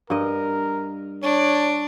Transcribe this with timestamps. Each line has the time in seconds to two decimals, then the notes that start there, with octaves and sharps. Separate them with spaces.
0.10 G2 A#4 D#5
1.23 D4 C#5